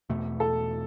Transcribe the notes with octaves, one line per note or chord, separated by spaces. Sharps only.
E2 B2 A3
A4